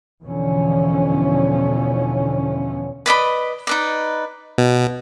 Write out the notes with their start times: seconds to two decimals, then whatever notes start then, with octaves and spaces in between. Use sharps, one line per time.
0.22 E2 B2 D3 E3 F3 C#4
3.06 B4 D5 D#5 B5
3.67 D#4 B4 D5
4.58 B2